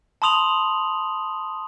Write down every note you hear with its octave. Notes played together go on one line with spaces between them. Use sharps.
A5 B5 C6 D#6 F7 F#7